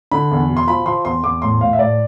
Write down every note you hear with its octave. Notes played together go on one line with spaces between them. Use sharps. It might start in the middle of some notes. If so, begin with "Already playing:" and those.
D3 B5
E2
B2
C6
F3 B5
F3 C6
E2 C6
E2 D6
A2 C6
A2 F5
E5
A2 D5